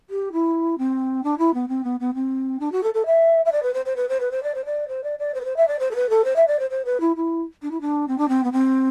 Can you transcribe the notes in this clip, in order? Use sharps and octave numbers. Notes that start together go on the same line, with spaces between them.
G4
E4
C4
D4
E4
B3
C4
B3
B3
C4
D4
F#4
A4
A4
E5
E5
D5
B4
C5
C5
B4
C5
B4
C5
D5
C5
D5
C5
D5
D5
C5
B4
C5
E5
D5
C5
A4
B4
A4
C5
E5
D5
C5
C5
B4
E4
E4
D4
E4
D4
C4
D4
C4
B3
C4